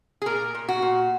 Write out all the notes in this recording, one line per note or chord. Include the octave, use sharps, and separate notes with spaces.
G#4
A#2 A#4
A#2
F#4
A#2